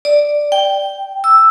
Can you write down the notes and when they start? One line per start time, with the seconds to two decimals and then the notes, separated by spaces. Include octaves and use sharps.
0.05 D5
0.52 G5
1.24 E6